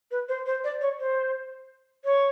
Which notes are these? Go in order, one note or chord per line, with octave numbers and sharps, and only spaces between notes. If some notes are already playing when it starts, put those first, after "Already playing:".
B4
C5
C5
D5
C#5
C5
C#5